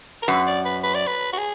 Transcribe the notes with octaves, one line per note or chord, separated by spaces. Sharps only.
A#4
F#2 B4
D5
B4
B4
D5
B4
F#4
G#4